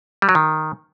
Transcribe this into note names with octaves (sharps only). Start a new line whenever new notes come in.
G3
F#3
D#3